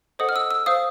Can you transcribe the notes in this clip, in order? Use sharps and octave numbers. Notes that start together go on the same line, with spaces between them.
A4 C5 D#5 F#5 D#6
F6
E6
E6
C5 F5 D#6